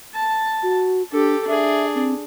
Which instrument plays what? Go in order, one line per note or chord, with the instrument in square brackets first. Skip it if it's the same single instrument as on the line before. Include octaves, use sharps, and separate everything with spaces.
[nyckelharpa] A5
[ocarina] F#4
[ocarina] D4 [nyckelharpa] G4 A4
[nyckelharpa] D4 G#4 [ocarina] E5
[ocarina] C4